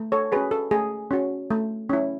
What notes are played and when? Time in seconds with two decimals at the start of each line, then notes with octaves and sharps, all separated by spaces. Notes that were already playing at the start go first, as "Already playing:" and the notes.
Already playing: A3
0.12 A4 C#5
0.32 C#4 F#4 G#4 B4
0.51 A4
0.71 A3 G#4
1.11 C#4 F#4
1.50 A3
1.89 C#4 E4